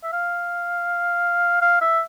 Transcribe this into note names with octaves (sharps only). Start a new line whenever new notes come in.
E5
F5
F5
E5